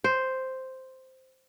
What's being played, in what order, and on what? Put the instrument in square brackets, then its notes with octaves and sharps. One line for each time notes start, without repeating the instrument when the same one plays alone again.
[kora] C5